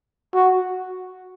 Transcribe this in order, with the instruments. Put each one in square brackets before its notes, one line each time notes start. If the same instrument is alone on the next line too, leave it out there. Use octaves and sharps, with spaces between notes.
[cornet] F#4